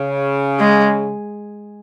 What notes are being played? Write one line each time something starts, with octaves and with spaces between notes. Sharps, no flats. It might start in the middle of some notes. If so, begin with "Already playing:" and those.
Already playing: C#3
G#3